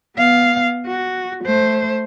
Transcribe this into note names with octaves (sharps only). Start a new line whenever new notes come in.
B3 F5
F#4
A3 C5